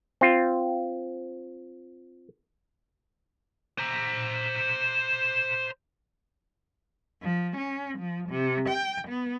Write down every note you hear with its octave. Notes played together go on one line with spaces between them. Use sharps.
C4 F4
C5 A#5
F3
C#4
F3
C3
G5
B3